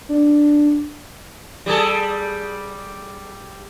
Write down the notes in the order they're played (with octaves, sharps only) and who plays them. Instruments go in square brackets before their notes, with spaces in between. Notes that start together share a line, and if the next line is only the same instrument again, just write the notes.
[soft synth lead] D4
[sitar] G3 G#4 A4